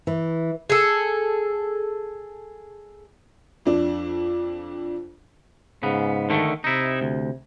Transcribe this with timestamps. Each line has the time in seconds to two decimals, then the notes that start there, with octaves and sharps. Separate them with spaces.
0.07 E3
0.70 G#4 A4
3.66 F2 D4
5.83 G#2 C#3 B3
6.30 D3 D#3 A3
6.64 C3 D#4 E4
7.01 D2